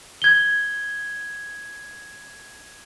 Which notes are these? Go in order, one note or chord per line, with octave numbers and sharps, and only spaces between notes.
G#6 G7